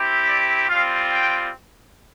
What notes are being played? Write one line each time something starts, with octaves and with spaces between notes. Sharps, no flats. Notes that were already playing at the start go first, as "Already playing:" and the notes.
Already playing: C4 E4 G4
D5
G3 C4 F4 F5
G5